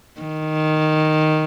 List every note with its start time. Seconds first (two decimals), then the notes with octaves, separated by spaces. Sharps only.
0.21 D#3